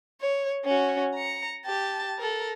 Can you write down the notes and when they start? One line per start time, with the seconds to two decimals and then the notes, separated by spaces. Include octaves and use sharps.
0.21 C#5
0.65 C#4 F#4
1.15 A#5 C#7
1.66 G4 A5
2.18 A4 A#4